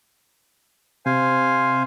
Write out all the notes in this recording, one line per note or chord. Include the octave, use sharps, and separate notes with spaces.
C3 C5 F5 G#5